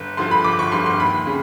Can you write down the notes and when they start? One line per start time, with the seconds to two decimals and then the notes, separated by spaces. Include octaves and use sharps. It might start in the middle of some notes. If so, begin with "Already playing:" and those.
Already playing: G1
0.17 G2 D3 F3 C6
0.31 B5
0.44 G1 D6
0.59 C#6
0.72 G2 D3 F3 C6
0.86 C6
1.00 D#2 B5
1.27 C#3